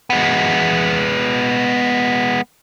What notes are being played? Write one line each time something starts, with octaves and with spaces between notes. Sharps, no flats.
G#3 B3